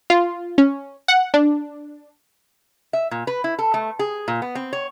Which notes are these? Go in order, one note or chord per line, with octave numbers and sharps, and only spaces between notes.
F4
C#4
F#5
D4
E5
A#2
B4
E4
A4
A3
G#4
A#2
B3
C4
C#5